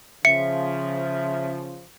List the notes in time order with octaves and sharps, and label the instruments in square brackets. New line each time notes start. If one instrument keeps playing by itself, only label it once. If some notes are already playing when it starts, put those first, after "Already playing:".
[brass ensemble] C#3 F3 [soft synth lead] E5 [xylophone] C#7